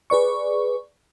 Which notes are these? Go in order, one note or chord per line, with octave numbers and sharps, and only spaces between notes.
G#4 B4 D5 C#6